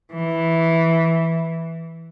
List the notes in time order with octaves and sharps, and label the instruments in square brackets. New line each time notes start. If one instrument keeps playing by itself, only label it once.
[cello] E3